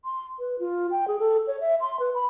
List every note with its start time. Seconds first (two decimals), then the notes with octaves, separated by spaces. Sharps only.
0.05 C6
0.39 B4
0.59 F4
0.91 G5
1.08 G#4
1.19 A4
1.47 C#5
1.60 E5
1.81 C6
1.99 B4
2.14 B5